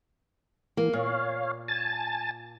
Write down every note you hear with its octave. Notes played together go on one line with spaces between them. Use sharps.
E3 A#3
A#2 C#5 F5
G#5 A5 A6